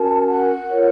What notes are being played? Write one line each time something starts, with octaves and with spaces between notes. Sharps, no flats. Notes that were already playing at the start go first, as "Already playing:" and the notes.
Already playing: C#4 F#4 A#4 A5
F#5
F4 A#4 C#5